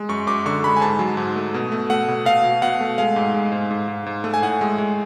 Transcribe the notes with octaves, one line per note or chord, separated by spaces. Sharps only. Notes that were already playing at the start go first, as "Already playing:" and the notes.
Already playing: G#3
F#2 C#6
F#2 D6
D3 C#6
G#3 B5
G#5
G#2 A5
F#3
G#2
A3
B2
A3
A3 F#5
B2
B2 F5
B2
B2 F#5
A3
G#3 F5
G#2
G#3
G#2
G#2
G#2
G#2
A3
G#5
A2 F#5
G#3
G#3